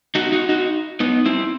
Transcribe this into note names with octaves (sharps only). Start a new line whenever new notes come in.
D#4 F#4
D#4 F#4
D#4 F#4
B3 D#4
C4 E4